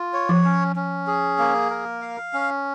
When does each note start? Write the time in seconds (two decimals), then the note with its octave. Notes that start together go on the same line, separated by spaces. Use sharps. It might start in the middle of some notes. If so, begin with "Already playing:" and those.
Already playing: F4
0.13 C#5
0.29 F3
0.45 C#4
0.76 C#4
1.07 G#4
1.39 A#3
1.70 A#4
2.02 F5
2.33 C#4